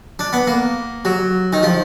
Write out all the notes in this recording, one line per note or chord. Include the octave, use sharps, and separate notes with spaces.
D4
B3
A#3
F#3
D#3
F3